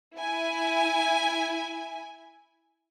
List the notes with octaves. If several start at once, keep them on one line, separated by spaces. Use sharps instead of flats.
E4 G#5